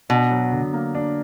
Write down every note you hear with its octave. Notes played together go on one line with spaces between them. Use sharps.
B2 D4
F#3
D3
A#3
D4